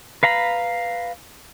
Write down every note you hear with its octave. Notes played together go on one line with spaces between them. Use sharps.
B4 F5 A#5 B5